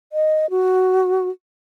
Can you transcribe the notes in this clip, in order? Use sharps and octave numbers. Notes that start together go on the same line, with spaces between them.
D#5
F#4